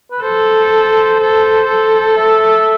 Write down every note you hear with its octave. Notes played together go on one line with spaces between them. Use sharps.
B4
A4 C5
A4 C5
A4
E5